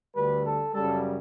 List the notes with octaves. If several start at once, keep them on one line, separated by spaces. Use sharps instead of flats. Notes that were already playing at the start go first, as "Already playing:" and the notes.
D2 D3 G3 B4
A4
F#2 C#3 G3 A4